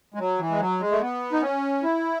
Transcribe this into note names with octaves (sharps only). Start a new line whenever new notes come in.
G#3
F#3
E3
G#3
F#3
G#3
A3
B3
D#4
C#4
E4